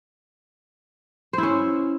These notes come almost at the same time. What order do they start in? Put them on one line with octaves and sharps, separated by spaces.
C5 E4 C#4